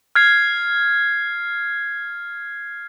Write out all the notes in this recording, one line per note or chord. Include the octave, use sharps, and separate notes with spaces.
F6 G#6 C7